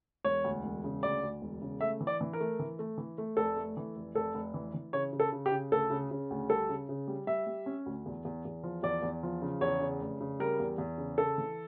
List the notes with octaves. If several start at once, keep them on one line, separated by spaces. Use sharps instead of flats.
E1 C#5
D2
E1
C#3
D2 D5
D2
E1
C#3
A3 E5
E3
D5
E3
A#4
A3
E3
A3
E3
A3
F1 A4
A3
E3
F1
F1 A4
F1
E3
E3
C#3 C#5
C#3
A4
C#3
G4
C#3
D2 A4
C#3
C#3
D2
G3 A4
C#3
C#3
G3
G3 E5
G3
C#4
D2
E2
E2
E2
F3
E2 D5
E2
F3
C#3
E2 C#5
C#3
F1
C#3
G3 A#4
E2
E2
C#3
C#3 A4
E3